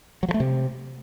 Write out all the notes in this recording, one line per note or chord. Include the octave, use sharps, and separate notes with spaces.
F#3
F3
A3
C3